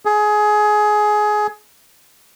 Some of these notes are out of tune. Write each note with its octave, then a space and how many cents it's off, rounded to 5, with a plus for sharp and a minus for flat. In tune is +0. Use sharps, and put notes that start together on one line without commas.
G#4 +20